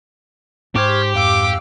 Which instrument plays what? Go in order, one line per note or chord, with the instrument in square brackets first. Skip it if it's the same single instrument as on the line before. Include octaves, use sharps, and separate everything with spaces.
[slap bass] G#2 [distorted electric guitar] G4 [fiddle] C5 [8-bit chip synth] C#6 F6 G#6
[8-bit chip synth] F2 F5 E6 [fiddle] D6